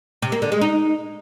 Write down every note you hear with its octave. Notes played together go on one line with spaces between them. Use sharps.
C3
A#3
D3
G#3
D#4